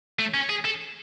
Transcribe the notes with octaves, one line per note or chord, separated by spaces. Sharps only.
A3
C#4
G#4
A4